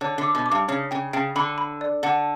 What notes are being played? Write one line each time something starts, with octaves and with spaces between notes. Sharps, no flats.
D3 C#5
D3
D6
B2
D6
G2
C#3 C#5
C#3 G5
C#3 G5
D3 B5
B5
D5
D3 F#5